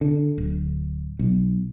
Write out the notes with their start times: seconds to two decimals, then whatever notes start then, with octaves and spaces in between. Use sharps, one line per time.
0.01 D3
0.38 D1
1.19 B1